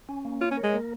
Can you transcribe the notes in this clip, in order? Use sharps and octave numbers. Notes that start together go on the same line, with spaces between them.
C#4
A#3
F4 C#5
C#4
A#4
G#3
A#3